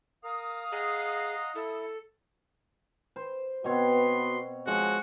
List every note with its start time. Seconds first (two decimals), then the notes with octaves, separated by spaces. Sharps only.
0.24 A#4 F5 D#6
0.72 G#4 D#5 F#5 A#5
1.55 E4 A4
3.16 C5
3.64 B2 B3 C4 F#4 C#5 C6
4.67 F3 G#3 C#4 F#4